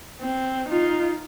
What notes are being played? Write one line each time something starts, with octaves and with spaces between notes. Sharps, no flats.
C4
D#4 F4